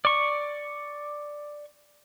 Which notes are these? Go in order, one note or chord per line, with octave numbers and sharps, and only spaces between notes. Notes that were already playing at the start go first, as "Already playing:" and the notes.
D5 C#6